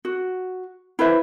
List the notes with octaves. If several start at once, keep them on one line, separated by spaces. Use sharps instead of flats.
F#4
E4 B4 C5 E5